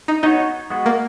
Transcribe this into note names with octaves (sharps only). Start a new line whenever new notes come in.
D#4
B3 D#4 F#4 C#5
G#3 B3 F#4
A#3